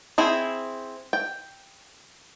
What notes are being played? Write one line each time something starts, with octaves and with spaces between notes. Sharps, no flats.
C4 E4 G#4
G5